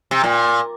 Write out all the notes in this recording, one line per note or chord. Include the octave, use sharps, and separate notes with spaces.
C3
A#2